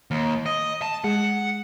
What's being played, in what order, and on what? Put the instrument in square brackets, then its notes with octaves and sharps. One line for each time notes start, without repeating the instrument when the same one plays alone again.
[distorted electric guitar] D#2
D#5
A5
[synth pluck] G#3 [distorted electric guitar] F#5